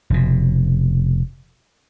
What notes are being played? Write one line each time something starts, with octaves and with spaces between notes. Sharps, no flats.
F1 B2